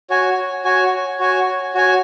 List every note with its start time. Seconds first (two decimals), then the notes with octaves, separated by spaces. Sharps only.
0.10 F#4 C#5 G#5
0.65 F#4 C#5 G#5
1.20 F#4 C#5 G#5
1.75 F#4 C#5 G#5